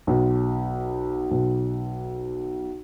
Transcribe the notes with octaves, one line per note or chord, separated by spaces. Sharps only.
B1
B1